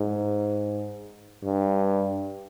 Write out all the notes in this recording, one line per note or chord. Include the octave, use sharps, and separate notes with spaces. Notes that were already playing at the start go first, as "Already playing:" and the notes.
Already playing: G#2
G2